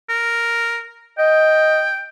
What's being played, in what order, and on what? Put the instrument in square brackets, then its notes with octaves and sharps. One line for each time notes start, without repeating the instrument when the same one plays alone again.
[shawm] A#4
[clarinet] D#5 [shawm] G5